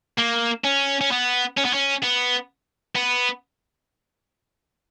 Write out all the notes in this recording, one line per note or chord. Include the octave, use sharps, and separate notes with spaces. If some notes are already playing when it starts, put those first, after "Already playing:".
A#3
C#4
C#4
B3
C#4
B3
C#4
B3
B3